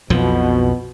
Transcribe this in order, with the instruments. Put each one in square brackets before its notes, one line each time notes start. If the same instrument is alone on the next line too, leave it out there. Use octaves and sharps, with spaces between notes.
[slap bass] B1 F2 F3 [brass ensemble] B2